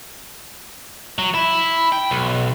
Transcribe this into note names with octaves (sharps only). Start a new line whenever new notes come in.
F#3
E4
G5
B1